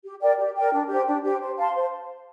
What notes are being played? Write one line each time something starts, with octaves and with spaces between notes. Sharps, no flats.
G4
A#4 D5 G5
G4
A#4 D5 G5
D4
G4 C5 G5
D4
G4 C5 G5
C5
F5 A5 C6
C5